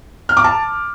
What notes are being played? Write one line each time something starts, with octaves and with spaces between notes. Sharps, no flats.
F6
D6
A5